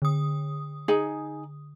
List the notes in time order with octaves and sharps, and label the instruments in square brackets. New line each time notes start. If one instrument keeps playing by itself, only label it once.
[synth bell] D3 D#6
[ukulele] D#4 G#4 G#5